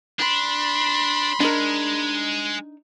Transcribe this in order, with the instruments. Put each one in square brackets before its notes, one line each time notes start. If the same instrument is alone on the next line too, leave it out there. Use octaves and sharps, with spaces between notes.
[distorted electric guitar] D4 [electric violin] B5 C6
[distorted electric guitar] G#3 [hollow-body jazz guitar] D4 D#4 A#4